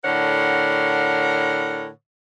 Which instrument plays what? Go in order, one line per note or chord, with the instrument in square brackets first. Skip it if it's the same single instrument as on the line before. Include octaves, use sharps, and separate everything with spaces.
[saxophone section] A2 D3 A#4 C#5 F#5